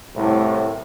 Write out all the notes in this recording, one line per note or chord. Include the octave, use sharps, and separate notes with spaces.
C2 A2